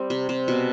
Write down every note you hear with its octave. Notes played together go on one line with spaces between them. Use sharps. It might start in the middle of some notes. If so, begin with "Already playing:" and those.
Already playing: G3 C4
C3
C3
B2